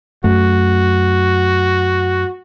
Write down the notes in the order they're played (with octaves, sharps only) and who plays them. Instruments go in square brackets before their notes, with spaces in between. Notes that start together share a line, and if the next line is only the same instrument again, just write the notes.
[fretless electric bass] F#2 A3 [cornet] F#4